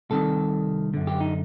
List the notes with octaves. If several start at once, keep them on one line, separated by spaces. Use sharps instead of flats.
C2 C3 D#3 A4
F#2 D3
G4
D#4